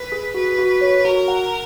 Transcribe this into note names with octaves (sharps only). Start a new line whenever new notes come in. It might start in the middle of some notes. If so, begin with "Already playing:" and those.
Already playing: B4
G#4
F#4 B4
F#4
C#5
F#4 A#4
F#5